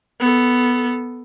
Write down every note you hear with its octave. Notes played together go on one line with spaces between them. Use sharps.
B3 A4